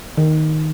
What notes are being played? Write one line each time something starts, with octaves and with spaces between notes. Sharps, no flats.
D#3